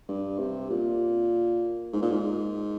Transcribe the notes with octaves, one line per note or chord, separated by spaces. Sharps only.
G2
C3
A#2
G#2
A#2
G#2